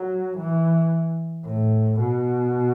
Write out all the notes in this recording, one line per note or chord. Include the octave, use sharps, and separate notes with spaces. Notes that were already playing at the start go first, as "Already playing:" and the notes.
Already playing: F#3
E3
A2
B2